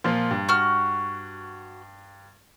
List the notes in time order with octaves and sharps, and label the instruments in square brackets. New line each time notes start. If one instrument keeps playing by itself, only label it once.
[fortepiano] A#2 F3
G2
[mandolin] F#4 F6